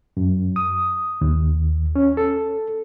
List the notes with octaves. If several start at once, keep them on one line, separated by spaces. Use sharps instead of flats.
F#2
D#6
D#2
C#4
A4